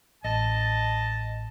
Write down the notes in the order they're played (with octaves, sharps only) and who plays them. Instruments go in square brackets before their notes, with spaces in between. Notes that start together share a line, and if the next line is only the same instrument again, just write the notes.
[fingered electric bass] A1 [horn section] D#5 A5